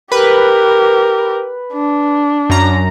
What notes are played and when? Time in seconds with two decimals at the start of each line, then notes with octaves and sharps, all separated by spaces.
0.12 G4 A#4 B4
1.73 D4
2.50 F#2 A#5